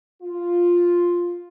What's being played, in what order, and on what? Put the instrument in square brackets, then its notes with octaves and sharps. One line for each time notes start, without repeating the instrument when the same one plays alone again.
[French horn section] F4